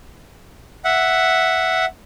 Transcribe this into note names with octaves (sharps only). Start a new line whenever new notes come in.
E5 F#5